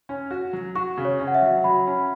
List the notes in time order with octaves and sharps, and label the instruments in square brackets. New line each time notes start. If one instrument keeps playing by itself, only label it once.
[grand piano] C#4
F#4
F#3
[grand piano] F#4 [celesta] C#6
[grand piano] C#3
[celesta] C#5
[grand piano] C#4
[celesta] F#5
E5
[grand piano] F#3
[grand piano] F#3 [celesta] B5
[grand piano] C#4